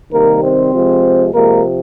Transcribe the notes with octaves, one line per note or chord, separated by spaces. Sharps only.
C3 D#3 G3 A#3 A#4
C4 C5
C3 F3 G#3
C3 F3 G#3 A#3 A#4